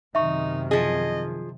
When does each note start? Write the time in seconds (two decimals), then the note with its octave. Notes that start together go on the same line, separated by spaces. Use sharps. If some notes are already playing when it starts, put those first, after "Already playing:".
0.15 F#2 C3 D#3 D#4 E5 C#6
0.71 F3 G#4 D#5